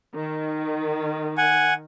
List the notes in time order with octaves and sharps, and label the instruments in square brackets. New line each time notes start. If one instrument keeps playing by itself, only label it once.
[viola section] D#3
[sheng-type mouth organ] F#5 G#5